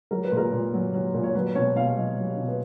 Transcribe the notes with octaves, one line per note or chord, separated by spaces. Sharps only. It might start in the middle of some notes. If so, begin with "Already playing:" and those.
F#3 A#4
B4
A#2 A#4
A#2
F#3
F#3
A#2
C#5
F#3 B4
B2 C#5
B2 F5
F5
F#3 D#5
F#3
B2
B4